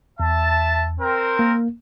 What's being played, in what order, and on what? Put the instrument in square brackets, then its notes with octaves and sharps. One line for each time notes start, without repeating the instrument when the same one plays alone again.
[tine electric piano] E2 [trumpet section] E5 A5
[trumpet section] C4 A#4
[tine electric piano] A#3